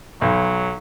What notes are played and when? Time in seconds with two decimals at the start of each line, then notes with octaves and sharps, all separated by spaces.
0.22 B1 F#3